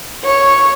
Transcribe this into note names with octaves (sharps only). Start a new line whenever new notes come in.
C#5